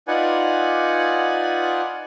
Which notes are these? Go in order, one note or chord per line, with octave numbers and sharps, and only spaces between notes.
D#4 F4 B4 D5 F#5 G#5